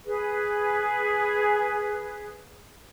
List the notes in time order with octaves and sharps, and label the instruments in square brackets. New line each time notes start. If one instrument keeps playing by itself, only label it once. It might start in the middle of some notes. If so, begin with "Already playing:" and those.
[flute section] G#4 B4